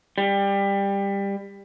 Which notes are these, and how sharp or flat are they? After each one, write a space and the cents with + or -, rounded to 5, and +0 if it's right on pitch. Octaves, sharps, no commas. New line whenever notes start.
G3 +20